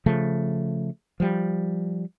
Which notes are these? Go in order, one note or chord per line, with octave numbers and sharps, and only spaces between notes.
C#3 F3 A3
F3 G3